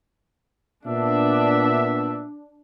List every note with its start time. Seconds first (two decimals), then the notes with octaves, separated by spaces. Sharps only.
0.86 A#2 B3 D4 E5